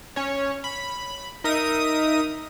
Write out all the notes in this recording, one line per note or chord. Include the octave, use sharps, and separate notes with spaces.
C#4 C#5
B5
D#4 A#4 E5 D#6 D#7